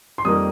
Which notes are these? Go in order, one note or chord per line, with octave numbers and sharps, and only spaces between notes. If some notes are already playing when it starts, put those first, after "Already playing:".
C6
F2 D#3 G3 A#3 D#6